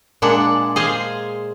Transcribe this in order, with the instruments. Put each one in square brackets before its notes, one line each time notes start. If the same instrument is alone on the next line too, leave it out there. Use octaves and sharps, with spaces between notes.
[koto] A#2 G#3 D4 F#5
G#4 C5 D#5 F5 G#5